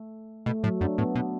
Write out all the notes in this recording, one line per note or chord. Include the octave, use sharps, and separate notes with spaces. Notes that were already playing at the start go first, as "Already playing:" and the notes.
Already playing: A3
B2 A3
A2 F#3
F#2 D4
A2 B3
B2